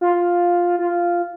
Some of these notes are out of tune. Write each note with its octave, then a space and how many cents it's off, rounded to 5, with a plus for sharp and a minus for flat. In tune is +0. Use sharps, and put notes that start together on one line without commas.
F4 +5
F4 -5